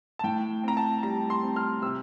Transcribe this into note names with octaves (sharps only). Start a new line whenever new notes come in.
A5
A2 G5
C4 A#5
A5
G3 A#5
C6
C4
F6
C3 E6